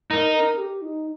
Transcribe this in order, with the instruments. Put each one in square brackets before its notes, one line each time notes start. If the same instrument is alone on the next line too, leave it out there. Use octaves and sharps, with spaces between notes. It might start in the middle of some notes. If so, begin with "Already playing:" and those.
[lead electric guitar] D#4 [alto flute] A#4
[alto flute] A#4
G4
D#4